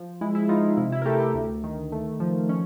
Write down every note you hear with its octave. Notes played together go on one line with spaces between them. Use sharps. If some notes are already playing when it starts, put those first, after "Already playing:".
Already playing: F3
G#3 E4
E4
F3 D#4 F4
E4
C3 E4
E4
A#4
A3 G4 A4
G4 A4
D2
D#3
A3
F3
C#4